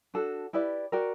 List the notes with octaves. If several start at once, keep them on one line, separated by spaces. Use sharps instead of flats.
D4 F#4 A4
E4 G4 B4 D5
F#4 A#4 D5 G5